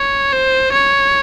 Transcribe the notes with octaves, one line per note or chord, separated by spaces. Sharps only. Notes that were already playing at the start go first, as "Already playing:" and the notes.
Already playing: C#5
C5
C#5